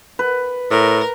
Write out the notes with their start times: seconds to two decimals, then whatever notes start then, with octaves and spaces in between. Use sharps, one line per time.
0.19 B4
0.71 A2 A#4